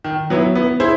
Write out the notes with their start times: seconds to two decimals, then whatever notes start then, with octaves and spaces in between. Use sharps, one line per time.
0.04 D#3
0.30 F#3 B3 E4
0.55 B3
0.80 E4 G#4 C5